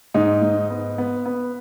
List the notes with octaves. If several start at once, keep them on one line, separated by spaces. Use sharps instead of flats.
G#2 D#4
G#2
B3
B3
B3